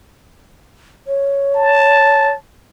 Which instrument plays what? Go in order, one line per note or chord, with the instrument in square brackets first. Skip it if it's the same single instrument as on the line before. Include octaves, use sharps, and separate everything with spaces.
[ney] C#5
[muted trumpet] A5